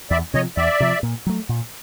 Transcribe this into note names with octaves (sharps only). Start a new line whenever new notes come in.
E2 D5 E5
C3 F3 C#5 D#5
E2 D5 E5
C3 F3
A#2
F#3 A3
A#2